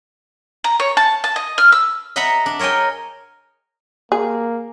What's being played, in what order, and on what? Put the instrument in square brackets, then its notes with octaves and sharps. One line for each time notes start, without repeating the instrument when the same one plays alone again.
[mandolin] A#5
C#5
A5
A5
D#5
F6
E6
[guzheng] D#5 E5 F#5 A#5 B5
D4
A#4 C#5 D#5 G5 G#5
[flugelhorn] A#3 [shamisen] G#4